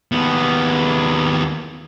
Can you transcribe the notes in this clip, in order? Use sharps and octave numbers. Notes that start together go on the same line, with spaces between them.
D#2 B3